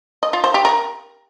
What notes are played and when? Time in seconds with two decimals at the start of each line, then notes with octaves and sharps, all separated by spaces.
0.23 D#5
0.33 F4
0.44 C5
0.54 G4
0.65 A#4